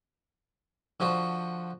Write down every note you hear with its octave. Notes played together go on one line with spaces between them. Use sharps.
D3 F3 F#4 C5